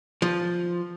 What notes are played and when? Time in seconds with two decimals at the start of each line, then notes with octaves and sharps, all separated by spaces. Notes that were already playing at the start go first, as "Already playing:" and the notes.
0.22 F3